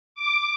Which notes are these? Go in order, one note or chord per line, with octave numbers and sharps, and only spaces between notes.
D6